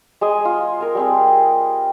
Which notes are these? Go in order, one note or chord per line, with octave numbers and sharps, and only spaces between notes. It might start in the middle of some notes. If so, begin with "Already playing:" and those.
G#3 G#4 D#5 G#5
F4
A#4 G#5
G3 C4 G#4